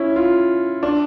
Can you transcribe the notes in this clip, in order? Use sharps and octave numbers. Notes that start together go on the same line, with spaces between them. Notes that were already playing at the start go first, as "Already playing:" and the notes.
Already playing: C#4 E4
F4
D4